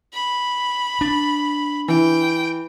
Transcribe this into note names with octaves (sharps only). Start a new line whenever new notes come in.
B5
D4
E3 G5